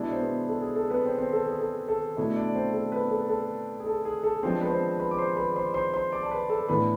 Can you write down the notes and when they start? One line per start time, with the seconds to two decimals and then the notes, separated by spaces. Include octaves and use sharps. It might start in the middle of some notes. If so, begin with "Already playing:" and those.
Already playing: B2 G#3 D4 E4 E5
0.12 C5
0.19 B3 B4
0.49 A4
0.62 G#4
0.76 A4
0.90 B3 B4
1.04 C4 C5
1.18 C4 C5
1.33 A4
1.47 G#4
1.61 A4
1.88 A4
2.17 B2 A3 D4 E4 E5
2.35 D4 D5
2.55 C4 C5
2.73 A4
2.92 B3 B4
3.11 A4
3.29 A4
3.80 G#4
3.87 A4
4.05 G#4
4.23 A4
4.43 F3 G#3 B3 C4 D4 C5
4.61 B4
4.71 C4 C5
4.99 B4 B5
5.11 D6
5.18 C5 C6
5.37 B4 B5
5.56 C5 C6
5.74 C5 C6
5.93 C5 C6
6.12 D5 D6
6.23 A5
6.31 B4 B5
6.49 A4 A5
6.68 A2 E3 B3 D4 B4 B5